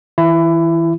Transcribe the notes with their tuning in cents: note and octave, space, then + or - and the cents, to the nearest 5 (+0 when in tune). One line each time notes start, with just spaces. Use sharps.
E3 -30 E4 +20